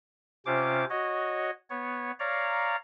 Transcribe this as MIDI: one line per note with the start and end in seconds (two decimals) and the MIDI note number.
0.46 0.85 48
0.46 0.85 61
0.46 0.85 65
0.46 0.85 72
0.46 0.85 86
0.90 1.51 66
0.90 1.51 73
0.90 1.51 75
1.70 2.11 59
1.70 2.11 73
2.19 2.76 73
2.19 2.76 74
2.19 2.76 77
2.19 2.76 82